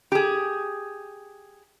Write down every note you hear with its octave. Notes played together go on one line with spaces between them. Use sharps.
G4 G#4